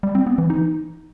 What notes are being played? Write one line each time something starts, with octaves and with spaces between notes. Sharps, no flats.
G3
C4
B3
E3
D#4